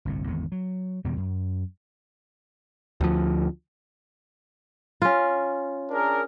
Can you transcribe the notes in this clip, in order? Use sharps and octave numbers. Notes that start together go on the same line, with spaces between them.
G1 C2 A2
G#1 E2 D3
F#3
E2 B2 D#3 G3
F#2
D2 F3
C#4 F4
D4 G#4 A#4